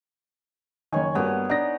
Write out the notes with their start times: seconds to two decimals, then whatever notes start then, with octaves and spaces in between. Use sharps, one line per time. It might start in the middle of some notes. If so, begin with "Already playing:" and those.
0.92 F#1 D#3 C#5 G#5
1.15 G2 A#3 B3 F#4 D6
1.50 D4 D#4 A#6